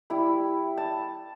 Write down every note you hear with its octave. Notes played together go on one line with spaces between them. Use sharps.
G3 E4 B5
A5